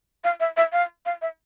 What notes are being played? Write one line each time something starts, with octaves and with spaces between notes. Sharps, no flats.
F5
E5
E5
F5
F5
E5